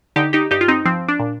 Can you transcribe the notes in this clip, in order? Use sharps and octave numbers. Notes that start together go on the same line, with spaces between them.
D3 D#4 G4
D#4 G4
G2 D#4 G4
F4
C4 D#4
F3 C4
D4
A#2